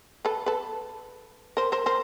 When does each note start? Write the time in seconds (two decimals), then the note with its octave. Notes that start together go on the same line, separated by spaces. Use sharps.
0.25 A4 B4
0.46 A4 B4
1.57 A#4 C5
1.72 A#4 C5
1.86 A#4 C5